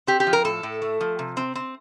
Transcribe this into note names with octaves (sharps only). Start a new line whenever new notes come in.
C4 G4
G4
F3
A#4
A2 A4
A2
A3
F3
C3
C4
C4